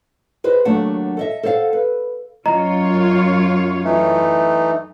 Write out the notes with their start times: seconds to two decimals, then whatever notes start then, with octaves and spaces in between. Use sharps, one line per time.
0.44 G#4 B4 C5 D#5
0.65 D#2 F#3 A3 D4 F#5
1.17 A4 D#5 E5
1.43 A4 C5 C#5 F5 F#5
1.73 B4
2.46 F#2 F4 C#5 D#5 A#5
3.84 E3 A3 D#4